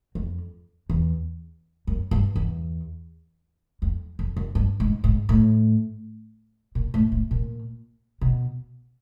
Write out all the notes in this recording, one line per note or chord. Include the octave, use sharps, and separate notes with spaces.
F2
E2
F#2
G2
E2
F2
F2
F#2
G2
G#2
G#2
A2
A#2
A2
A2
A#2
B2